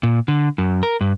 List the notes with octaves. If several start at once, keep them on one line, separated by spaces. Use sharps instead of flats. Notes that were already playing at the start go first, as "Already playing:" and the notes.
A#2
D3
F#2
A#4
G2